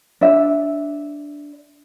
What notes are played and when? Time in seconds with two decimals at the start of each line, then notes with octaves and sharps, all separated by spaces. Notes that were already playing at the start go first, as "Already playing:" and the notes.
0.21 D4 E5